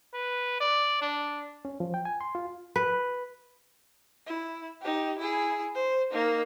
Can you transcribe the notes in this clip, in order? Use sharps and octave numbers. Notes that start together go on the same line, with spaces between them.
B4
D5
D4
C#4
F3
G5
G#5
C6
F4
B4
E4
D#4 G4
E4 G#4
C5
A#3 D#4